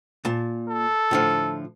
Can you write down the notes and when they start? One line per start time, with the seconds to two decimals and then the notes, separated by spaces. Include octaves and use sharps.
0.25 A#2 A5
0.69 A4
1.11 A2 D3 F3